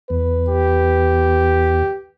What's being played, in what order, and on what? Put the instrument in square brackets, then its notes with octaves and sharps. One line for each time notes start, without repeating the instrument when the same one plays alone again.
[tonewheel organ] E2 [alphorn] B4
[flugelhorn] G4